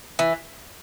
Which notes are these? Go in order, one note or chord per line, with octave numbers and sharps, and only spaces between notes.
E3